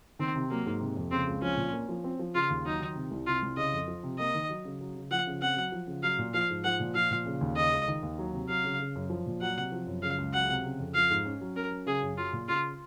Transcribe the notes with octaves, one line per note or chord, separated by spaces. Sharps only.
D#3 C4
C3
F#3 A#3
G#2
C3
F2
C#3 C4
C#2
F3 C#4
A#2
A#3
F3
C4
F3
C#3 F4
D#2
F#3 D#4
D#3
C3
C2
C3 F4
C2
C#3 D#5
F2
F3
C3
A#3 D#5
D#3
F#3
C#3
F#3
C#3
F3 F#5
C#3
C4 F#5
F#3
F3
C#3
F#3 F5
A#2
F3 F5
G#2
F3 F#5
A#2
F3 F5
A#2
C#3
D#2
C#3 D#5
C#2
D#3
D#2
F#3
C3
F#3 F5
C#3
C#3
F#2
F3
A#2
F#3 F#5
C3
F3
F#2
C#3 F5
C#2
F#3 F#5
C3
C#3
F2
F3 F5
G#2
C#4
F#3
C#4 A#4
F#3
C#3 G#4
F#2
F#3 F4
A#2
C#3 F4